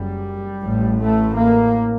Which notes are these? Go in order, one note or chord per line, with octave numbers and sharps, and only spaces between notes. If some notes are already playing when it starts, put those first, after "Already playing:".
Already playing: F#1 F#2 G3
A1 A2
A3
A#3